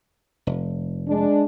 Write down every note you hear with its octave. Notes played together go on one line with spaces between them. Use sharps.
F1
G#3 D4